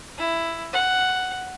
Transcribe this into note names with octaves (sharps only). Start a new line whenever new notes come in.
E4
F#5